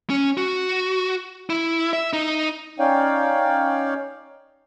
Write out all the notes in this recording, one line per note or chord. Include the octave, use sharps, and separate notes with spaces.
C#4
F#4
E4
E5
D#4
C#4 D#4 C#5 D5 F5 G5